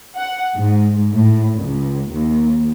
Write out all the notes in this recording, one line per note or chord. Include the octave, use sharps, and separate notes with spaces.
F#5
G#2
A2
C#2
D#2